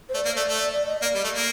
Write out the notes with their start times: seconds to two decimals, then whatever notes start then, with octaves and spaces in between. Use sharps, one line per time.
0.09 C5
0.15 A3 D5
0.25 A#3
0.36 A3 D5
0.48 A3
0.58 D5
0.73 D5
0.87 D#5
1.02 A#3 D5
1.15 G3
1.24 A3
1.34 A#3